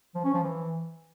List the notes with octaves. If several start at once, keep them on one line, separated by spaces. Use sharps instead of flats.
F3
C#4
F3
E3